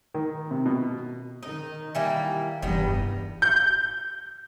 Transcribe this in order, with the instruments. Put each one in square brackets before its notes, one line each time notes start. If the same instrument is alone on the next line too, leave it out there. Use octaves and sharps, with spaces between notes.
[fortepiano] D#3
C3
B2
[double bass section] D#3 [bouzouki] D#4
[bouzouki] E3 G3 A#3
[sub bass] F1 [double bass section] E2 G2 E3 [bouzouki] D#3 G3 B3
[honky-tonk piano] G6